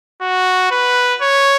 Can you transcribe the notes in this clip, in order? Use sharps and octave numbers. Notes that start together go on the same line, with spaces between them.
F#4
B4
C#5